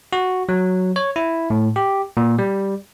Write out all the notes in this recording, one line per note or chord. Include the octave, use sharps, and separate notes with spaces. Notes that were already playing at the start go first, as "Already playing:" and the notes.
F#4
F#3
C#5
E4
A2
G4
A#2
G3